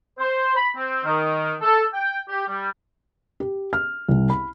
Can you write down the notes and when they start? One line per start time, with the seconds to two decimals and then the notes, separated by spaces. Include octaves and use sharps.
0.18 C5
0.55 B5
0.76 C4
1.04 D#3
1.60 A4
1.93 G5
2.29 G4
2.48 G3
3.40 G4
3.73 F6
4.08 C2
4.30 B5